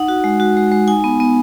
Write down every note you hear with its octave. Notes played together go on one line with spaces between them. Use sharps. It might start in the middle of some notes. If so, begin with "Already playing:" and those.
Already playing: D#4 F#5
F#4
G#3
F#4
G#3
G#3
D#4 G#5
B3
B3